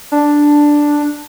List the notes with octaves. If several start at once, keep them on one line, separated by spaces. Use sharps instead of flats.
D4